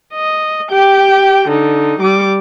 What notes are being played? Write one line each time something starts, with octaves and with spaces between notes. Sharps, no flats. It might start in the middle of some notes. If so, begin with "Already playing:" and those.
D#5
G4 G5
D3 D#4
G3 D6